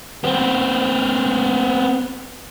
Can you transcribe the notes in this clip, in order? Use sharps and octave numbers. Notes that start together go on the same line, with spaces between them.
B3 C4